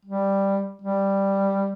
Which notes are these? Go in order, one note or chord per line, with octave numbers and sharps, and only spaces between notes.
G3
G3